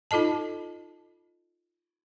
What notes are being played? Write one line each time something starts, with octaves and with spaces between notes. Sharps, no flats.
D#4 F4 A4 D#5 A5